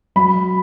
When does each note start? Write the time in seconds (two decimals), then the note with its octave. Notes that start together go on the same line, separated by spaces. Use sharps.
0.16 F#3 B5